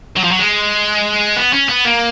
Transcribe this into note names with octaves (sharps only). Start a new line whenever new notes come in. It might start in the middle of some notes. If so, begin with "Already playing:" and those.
F#3
F3
F#3
G#3
B3
C#4
B3
A#3